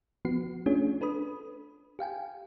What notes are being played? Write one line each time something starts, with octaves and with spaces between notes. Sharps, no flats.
F3 B3 F#4 C7
A3 C#4 D4 F4 G#4 C#5
D4 A4 B4 B5 D#6
G4 F5 G5 G#5